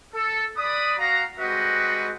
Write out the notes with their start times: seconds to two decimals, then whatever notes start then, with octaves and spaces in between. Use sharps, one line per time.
0.14 A4
0.57 B4 D5 B5 D#6
0.98 F#4 F5 A#5
1.39 G3 G#3 C4 F#4 B4 D#5